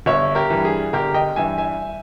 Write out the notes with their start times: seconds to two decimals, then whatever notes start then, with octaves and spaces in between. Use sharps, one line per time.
0.06 G1 C#5 E5
0.35 G4 A#4
0.50 G2 E3
0.65 G#4
0.93 G1 G4 A#4
1.14 D#5 G5
1.36 G2 E3 E5 G#5
1.58 E5 G#5